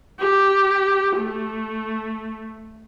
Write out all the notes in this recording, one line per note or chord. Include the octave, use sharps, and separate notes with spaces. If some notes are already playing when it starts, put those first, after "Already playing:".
G4
A3